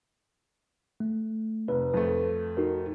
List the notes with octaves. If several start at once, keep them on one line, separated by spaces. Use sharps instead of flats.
A3
F1 B4
F2 A3
D#4 F#4 A#4